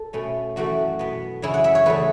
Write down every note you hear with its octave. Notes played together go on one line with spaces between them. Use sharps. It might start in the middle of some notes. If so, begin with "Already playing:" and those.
Already playing: A4
B2 A3 C#4
F#2 E3 A3 F#4
B2 B3
F#2 C#3 E3 C#4 E4
F#5
E5
C#5
E2 C#3 A3 B4